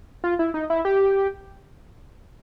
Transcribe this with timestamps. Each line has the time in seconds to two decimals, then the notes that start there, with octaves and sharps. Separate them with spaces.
0.24 F4
0.39 E4
0.54 D#4
0.70 E4
0.85 G4